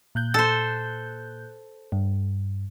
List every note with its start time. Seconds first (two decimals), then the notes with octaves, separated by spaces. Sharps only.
0.15 A#2 F#6 G6
0.34 A4 C5
1.92 G2